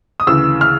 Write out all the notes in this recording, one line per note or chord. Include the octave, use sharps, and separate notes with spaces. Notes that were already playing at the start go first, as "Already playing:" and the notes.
D#6
D2 C#3 E3 E6
F6